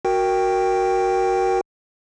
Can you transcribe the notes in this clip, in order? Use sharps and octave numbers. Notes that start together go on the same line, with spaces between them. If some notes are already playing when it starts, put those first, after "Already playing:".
F#4 A#4 G5